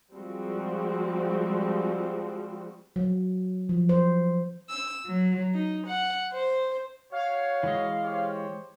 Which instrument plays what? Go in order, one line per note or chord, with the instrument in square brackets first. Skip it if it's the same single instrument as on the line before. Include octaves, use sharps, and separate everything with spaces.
[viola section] F3 G3 G#3 C4 F#4
[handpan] F#3
F3
C5
[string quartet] E6
F#3
D#4
F#5
C5
[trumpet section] F#4 C#5 [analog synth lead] F5
[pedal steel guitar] E3 G#3 D#5
[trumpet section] G4 C5 C#5